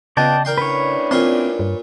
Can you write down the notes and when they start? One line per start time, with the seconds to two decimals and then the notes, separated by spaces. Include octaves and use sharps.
0.17 C#3 B3 F4 D5 D#5 G5 A5
0.45 E2 A#4 D5 G5 C6
0.58 A2 C#4 D4 B4 C#5
1.11 A#2 C4 F4 C6
1.59 G2